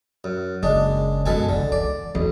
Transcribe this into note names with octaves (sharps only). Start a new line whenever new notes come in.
F#2
F#1 G#3 D4
F#2 B2 G#3 A4 G#5
G#1 C#2 D3
E3 D5
B1 E2